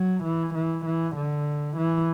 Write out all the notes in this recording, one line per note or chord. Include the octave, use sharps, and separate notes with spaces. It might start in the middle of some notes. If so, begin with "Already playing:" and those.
Already playing: F#3
E3
E3
E3
D3
E3